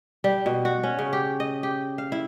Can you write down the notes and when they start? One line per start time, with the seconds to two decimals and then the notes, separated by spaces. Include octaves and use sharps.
0.24 G3
0.46 B2
0.65 F#4
0.83 C#4
0.99 C#3
1.13 G4
1.40 D#5
1.63 G4
1.98 F5
2.12 E4